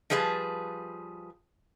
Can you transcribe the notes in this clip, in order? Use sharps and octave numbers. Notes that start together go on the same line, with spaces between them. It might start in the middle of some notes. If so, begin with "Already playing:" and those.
F3 G3 G#4 B4 D5 A5